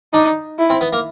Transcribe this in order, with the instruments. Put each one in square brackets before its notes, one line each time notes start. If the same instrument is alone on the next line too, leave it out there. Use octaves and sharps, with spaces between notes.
[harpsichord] D4 [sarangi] D#4
[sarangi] E4
[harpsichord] C4
B3
A#3